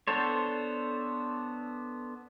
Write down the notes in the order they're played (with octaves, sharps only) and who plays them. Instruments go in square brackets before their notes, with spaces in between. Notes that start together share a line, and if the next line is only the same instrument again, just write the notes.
[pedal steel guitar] B3 D4 A4 C5 C#5